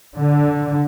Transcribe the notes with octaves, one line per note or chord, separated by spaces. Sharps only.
D3